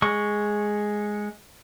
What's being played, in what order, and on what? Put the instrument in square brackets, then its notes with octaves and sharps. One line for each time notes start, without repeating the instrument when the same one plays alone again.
[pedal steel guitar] G#3 C#6